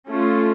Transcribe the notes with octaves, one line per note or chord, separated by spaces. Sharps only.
A3 C#4 F4